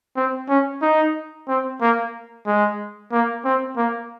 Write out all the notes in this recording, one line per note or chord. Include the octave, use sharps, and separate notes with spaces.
C4
C#4
D#4
C4
A#3
G#3
A#3
C4
A#3